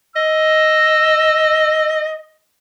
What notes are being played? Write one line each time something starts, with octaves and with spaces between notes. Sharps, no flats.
D#5 E6